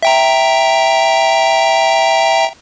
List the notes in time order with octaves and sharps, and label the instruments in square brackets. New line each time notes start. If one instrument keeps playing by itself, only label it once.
[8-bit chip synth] E5 G5 A#5